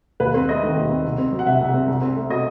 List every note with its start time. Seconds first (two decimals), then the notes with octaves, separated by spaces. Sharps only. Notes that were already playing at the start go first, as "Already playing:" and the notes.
0.20 D#2 B4
0.34 C4 C5
0.49 A3 D#5
0.63 D#3
0.76 D#2
0.90 C4
1.04 C2
1.18 C4
1.32 F#3
1.39 F#5
1.46 C3 E5
1.61 C2
1.74 C4
1.87 C2
2.01 C4
2.16 A3
2.29 B2 D#5